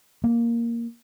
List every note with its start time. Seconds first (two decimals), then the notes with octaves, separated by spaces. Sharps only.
0.24 A#3